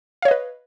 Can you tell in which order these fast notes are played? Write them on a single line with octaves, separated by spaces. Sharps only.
F5 C#5 D#5 B4